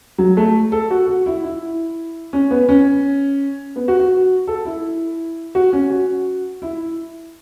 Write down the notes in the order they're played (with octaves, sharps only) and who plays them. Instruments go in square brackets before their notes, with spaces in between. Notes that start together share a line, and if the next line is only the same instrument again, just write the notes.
[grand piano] F#3
A3
A4
F#4
F#4
E4
E4
C#4
B3
C#4
B3
F#4
F#4
A4
E4
F#4
C#4
F#4
E4